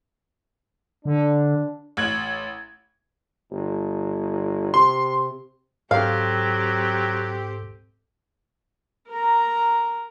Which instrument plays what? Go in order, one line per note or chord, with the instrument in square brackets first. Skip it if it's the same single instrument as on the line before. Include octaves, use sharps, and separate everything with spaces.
[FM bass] D3 [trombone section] D4
[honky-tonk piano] A1 G#6 F#7
[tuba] G1
[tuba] C3 [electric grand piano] C6
[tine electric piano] G#2 A4 [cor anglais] F#3 [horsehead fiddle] C4 G4 [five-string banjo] F5
[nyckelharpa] A#4 A#5